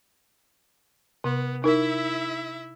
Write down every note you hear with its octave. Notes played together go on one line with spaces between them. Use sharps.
C3 B3
D#4 E4 A#4 E5